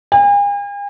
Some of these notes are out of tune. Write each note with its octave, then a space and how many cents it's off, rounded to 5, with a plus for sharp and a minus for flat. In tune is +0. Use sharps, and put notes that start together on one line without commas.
G#5 -45